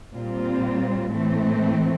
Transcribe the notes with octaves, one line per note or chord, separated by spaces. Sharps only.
A#2 G3 C4 F4
A2 E3 A3 C4